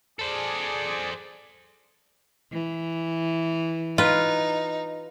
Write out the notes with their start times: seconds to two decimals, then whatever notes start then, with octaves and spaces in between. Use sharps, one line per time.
0.19 G#4 A4 C5 D5
2.52 E3
3.98 D#4 F4 B4